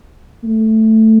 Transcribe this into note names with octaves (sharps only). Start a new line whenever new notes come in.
A3